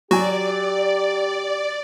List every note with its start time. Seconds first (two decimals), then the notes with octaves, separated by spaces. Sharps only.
0.11 F#3 F#4 G4 D5 G#5